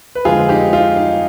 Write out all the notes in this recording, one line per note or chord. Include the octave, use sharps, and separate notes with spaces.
B4
F2 D3 G#3 F4 G#4
D#4 G4
F4
D#4